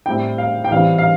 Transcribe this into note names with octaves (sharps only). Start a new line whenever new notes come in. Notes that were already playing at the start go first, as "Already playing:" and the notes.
A2 G3 C4 E4 G5
F5
G5
E3 G3 C4 F5
F5